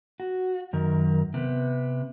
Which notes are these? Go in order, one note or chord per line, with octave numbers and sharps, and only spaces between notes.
F#4
F#2 D#3 A#4
C3 B3